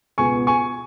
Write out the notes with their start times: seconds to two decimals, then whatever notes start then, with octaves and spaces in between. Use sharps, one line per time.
0.18 C#2 B2 B3 G#5 C#6
0.47 G#5 C#6